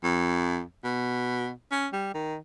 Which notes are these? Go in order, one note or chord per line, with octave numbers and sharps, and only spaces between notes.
F2
B2
C#4
G3
D#3